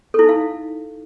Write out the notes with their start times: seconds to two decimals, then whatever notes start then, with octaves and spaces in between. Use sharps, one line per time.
0.14 A4
0.19 E4
0.24 D#4
0.29 F5